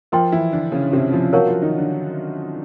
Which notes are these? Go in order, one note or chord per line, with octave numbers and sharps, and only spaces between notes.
F3 F4 A#4 D#5 G5 C6
E3 E4
D3 D4
C#3 C#4
C3 C4
F3 F4
F#3 F#4 A#4 C#5 F5 A5 C#6
F3 F4
D#3 D#4
D3 D4